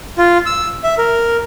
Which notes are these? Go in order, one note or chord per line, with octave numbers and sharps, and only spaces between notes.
F4
E6
E5
A#4